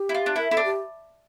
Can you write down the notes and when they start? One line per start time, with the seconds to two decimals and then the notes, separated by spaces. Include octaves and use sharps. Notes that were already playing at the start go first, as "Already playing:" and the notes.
Already playing: G4
0.09 E4
0.14 F4
0.26 D4
0.36 E4 A#4
0.51 E4 A4
0.57 D4
0.65 G4